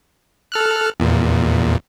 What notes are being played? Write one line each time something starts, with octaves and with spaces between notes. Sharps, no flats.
A4 F6 F#6
E2 A#2